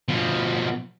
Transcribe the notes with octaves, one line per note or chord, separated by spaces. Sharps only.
B2 F3